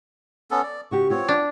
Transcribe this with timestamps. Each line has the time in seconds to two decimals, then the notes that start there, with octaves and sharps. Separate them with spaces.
0.51 B3 C#4 A4
0.63 D5
0.91 C#3 F#4 G4 C#6
1.10 B3 C4 F4 C#5
1.29 D4